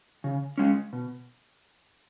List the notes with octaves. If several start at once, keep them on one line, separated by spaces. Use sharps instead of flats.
C#3
G#3 C#4
B2